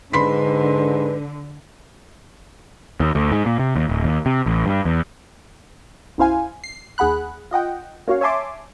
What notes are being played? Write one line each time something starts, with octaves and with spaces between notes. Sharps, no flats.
G#2 D3 B4 B5 C6 B6
D#2
D2
G#2
A#2
C3
D#2
D1
D#2
C3
A1
G2
E2
B1 F#2 E4 C5 F5 G#5
C7
D#2 G#4 F#5 B5 F#6
F4 D#5 F#5 G5
A#3 C#4 F#4 C#5 F5
C#5 E5 G#5 A5 C6 D6